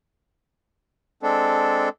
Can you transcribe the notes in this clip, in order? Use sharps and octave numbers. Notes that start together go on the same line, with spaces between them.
G#3 C4 D4 A4